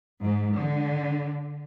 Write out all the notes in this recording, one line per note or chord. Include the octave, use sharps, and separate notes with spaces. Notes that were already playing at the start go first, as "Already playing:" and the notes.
G#2
D3